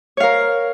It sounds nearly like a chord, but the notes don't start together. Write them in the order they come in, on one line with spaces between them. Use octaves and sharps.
C#5 F5 A#4